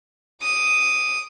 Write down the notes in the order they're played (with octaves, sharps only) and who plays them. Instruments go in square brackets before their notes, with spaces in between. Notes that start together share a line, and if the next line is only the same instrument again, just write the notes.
[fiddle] D6 D#6